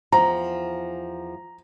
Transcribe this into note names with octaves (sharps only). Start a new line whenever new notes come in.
E2 F3 A#5